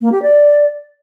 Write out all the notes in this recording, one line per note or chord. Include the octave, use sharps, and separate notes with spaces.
A#3
G4
D5